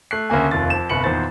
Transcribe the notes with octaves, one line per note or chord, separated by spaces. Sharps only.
A3 F#6 C7
D2 C#3 A#3 G#5
F1 D#2 F4 A6
F2 E7
G1 C2 B4 C#7 F#7
E2 A#2 D#3 C5 A6